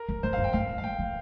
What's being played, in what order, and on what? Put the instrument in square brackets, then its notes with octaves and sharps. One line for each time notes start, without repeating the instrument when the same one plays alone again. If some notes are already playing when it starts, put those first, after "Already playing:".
Already playing: [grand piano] A#4
[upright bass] F2
[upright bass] F2 [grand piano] C5
[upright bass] G2 [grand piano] F5
[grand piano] G5
[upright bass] G2 [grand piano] F5
[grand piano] F5
[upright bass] G2 [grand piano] G5
[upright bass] F3